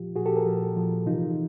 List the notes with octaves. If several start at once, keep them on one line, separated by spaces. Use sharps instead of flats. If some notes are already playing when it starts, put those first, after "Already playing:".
Already playing: A#2 F3 F4 G4
A#2 F3 F#4 G#4
G4 A4
G#4 A#4
F3
A#2
A#2 F3
C3 E3 D#4 F4